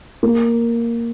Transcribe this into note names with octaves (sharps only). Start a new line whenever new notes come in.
A#3